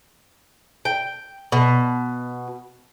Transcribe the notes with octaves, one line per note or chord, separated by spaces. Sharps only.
G5
B2